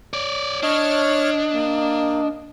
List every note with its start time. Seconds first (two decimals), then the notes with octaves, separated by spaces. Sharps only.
0.13 C#5 D5
0.63 D4 C#5 D#5 F6
1.54 A#3